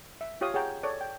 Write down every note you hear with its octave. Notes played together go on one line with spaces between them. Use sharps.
E5
F4 G4 C#5 F5 D#6
G#4 C#5 F#5 G5 A#5
A4 C#5 D5
G5